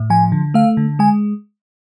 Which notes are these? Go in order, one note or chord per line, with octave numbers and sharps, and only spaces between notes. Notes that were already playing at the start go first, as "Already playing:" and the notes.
Already playing: A2
F3 G#5
D3
A3 F5
D3
G#3 G#5